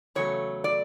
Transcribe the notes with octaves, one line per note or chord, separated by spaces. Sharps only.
E2 C#3 F#3 A3 C#5
D5